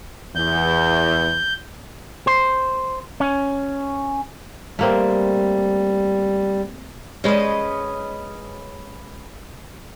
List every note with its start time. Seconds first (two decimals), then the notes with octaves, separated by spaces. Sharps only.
0.35 E2 G6
2.27 C5
3.20 C#4
4.79 G3 A3 A#3 C4
7.24 G#3 C#4 B4 C5 D#5